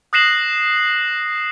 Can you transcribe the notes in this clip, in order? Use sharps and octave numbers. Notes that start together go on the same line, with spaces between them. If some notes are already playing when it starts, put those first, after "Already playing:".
D#6 F#6 A#6 C7 E7 F#7